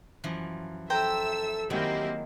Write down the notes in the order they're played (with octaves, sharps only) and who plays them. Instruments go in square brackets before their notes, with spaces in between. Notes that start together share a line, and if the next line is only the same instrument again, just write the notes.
[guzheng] F#2 E3 F3
[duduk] A4 [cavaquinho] C5 G5 A#5 [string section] E5 E6
[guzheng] D#3 F#3 G#3 [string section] A#3 C4 E4 [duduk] G4